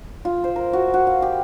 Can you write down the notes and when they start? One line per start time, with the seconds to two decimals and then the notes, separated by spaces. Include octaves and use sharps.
0.25 F4
0.44 C5
0.56 A#4
0.73 F#4
0.94 F#4
1.07 F5
1.22 G4